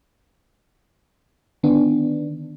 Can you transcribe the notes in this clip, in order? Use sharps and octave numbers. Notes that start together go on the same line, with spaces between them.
D3 D#3 B3 D4